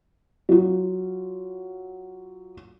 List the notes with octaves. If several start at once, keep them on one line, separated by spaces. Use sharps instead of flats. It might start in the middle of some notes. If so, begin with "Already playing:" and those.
F#3 F4